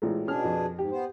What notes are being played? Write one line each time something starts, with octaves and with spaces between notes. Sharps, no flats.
A1 A#2 G#3
B2 C#4 D4 G#4 F6
F2
G#2 G4
B3 C5